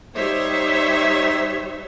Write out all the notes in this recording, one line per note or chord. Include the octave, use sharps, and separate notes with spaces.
G3 D#4 C5 C#5 E5